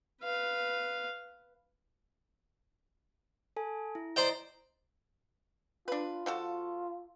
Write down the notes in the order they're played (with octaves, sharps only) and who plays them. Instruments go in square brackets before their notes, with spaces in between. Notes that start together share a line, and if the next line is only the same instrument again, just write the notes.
[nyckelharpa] B4 F5
[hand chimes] A4 G#5
E4
[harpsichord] C5 D5 G5 [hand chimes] D#5 A#5
[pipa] D4 B4 [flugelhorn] F4
[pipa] F3 F#4 A4